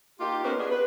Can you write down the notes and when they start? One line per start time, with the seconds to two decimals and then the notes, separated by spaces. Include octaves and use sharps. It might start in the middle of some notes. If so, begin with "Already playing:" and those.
0.20 A#3 D#4 F4 G4
0.44 A#3 B3 C#4 G4 A#4 C5
0.58 B3 D4 G#4
0.71 B4